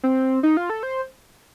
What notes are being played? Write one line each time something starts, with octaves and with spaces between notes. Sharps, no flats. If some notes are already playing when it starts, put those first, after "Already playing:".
C4
D#4
F4
A4
C5